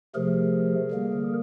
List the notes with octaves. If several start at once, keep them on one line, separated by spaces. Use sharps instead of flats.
C3 F3 A3 G#4 A#4
D3 G3 A#3